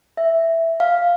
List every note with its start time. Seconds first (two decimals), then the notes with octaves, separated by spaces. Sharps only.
0.17 E5
0.80 F5